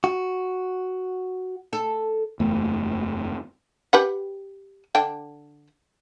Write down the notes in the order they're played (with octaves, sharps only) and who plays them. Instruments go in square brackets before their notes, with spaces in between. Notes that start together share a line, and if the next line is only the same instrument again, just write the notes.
[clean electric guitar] F#4
[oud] A4
[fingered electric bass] F#1 E2 A3
[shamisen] G4 B4 F#5
D3 D4 G5